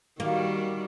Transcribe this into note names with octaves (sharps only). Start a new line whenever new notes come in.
D#3 G3 A#3 F#4